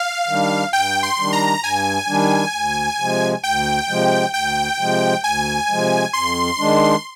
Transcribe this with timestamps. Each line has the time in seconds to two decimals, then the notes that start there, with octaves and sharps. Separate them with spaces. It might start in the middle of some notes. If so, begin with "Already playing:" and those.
Already playing: F5
0.28 D#3 G3 D4
0.73 G2 G5
1.03 C6
1.19 D#3 G3 D4
1.33 A#5
1.62 G2 G#5
2.08 D#3 G3 D4
2.53 D2
2.98 C3 F3 G#3
3.43 D2 G5
3.89 C3 F3 G#3
4.33 D2 G5
4.78 C3 F3 G#3
5.23 D2 G#5
5.69 C3 F3 G#3
6.13 F2 C6
6.59 D#3 G#3 D4